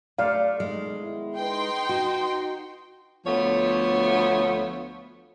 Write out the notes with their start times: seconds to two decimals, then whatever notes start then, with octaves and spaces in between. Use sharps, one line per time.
0.18 A3 D5 F5
0.60 B2 D#3 G#3 D#4
1.00 D#3 B3 E4
1.38 D#4 B4 G5 C6
1.89 F#4
3.26 D2 F3 A3 B3 C#5